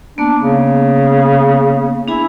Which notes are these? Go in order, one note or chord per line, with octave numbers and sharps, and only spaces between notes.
A#3 B3 D4
C#3
D4 E4 G#4 G#5